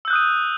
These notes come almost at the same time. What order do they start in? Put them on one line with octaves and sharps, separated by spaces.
E6 G6 F#6 D#6 D#7